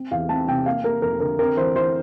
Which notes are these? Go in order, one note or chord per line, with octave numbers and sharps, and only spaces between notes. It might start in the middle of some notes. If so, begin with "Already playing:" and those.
Already playing: C4
E2 F5
C4 A5
C3 G5
A#3 F5
A#3 A#4
F2 A#4
D3 A#4
C4 A#4
E3 C5
E3 C5